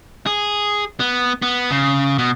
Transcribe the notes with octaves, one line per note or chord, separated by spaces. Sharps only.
G#4
B3
B3
C#3
B2